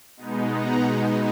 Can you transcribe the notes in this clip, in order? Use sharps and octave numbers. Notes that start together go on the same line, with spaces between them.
B2 G#3 B3 D#4
F#5 A#5